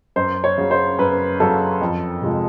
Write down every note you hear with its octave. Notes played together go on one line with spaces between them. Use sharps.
F#2 C5
C#5
C#3 F#3
C5
F#2 B4
C#3 F#3 A4
F2
C3 F3 G#3